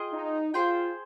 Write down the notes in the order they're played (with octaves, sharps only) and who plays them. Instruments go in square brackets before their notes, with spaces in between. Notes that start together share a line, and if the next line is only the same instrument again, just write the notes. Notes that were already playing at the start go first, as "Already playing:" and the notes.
Already playing: [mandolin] F4 G#4 D#5 G5
[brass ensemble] D#4
[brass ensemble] F4 [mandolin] G#4 C5 G5